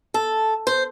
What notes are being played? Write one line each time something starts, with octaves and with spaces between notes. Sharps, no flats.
A4
C5